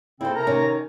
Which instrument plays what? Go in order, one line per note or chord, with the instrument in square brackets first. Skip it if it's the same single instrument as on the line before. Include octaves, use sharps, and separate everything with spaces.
[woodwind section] C#3 C4 [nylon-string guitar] E4 A4
[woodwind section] C3 A#4 A#5
[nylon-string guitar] D#3 C#4